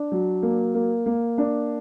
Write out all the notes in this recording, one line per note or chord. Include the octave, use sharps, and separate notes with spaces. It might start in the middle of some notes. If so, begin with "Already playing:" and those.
Already playing: D4
F#3
A#3
A#3
A#3
D4